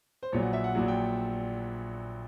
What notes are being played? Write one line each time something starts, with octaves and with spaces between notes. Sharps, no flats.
C5
A#1 A#2 F#3 C#5
F#5
E5
F#5
A#1 A#2 F#3
G5